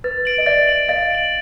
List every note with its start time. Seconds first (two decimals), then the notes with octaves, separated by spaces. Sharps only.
0.04 B4 A6
0.25 D7 F#7
0.38 D#5
0.46 D5 E5 A6
0.67 D7 F#7
0.88 D#5 F5 A6
1.10 D7 F#7